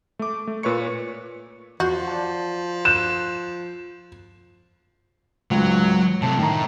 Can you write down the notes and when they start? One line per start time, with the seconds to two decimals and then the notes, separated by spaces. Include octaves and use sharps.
0.19 A3 D6
0.47 A3
0.63 A#2 B4 C#5 C#6 C#7
1.80 E2 F3 F#4 G6
2.08 D5 A5
2.85 F#6 G6 E7
5.51 C#2 G#2 F#3
6.22 C3 A3 A5
6.39 A2 D#3 A#5